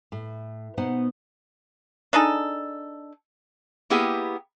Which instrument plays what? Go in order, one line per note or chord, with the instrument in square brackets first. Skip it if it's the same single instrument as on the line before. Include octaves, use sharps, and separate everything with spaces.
[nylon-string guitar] A2
B2 B3 D#4 C5 F#5
[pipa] D4 D#4 G#4 A4
[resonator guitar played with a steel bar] A#3 B3 E4 G4 G#4 G5